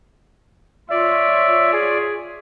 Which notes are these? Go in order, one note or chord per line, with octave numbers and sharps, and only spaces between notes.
F4 C#5 D5 E5
G#4